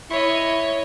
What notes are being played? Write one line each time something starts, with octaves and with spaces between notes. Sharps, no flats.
E4 C#5 D#5